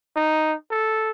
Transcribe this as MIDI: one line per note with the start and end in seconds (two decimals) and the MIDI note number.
0.16 0.54 63
0.71 1.11 69